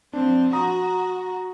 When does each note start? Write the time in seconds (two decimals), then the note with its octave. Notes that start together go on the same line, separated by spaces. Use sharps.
0.13 F3 C4 D4
0.53 F#4 A#5 D#6